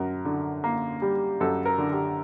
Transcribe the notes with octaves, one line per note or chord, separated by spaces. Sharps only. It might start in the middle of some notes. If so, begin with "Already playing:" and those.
Already playing: F#2 A#4
D3
A#3
G3
F#2 A4
A#4
D3
G4